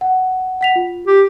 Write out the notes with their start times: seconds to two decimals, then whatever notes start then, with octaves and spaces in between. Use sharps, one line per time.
0.01 F#5
0.61 F#5 B6 F7
0.76 F4
1.07 G4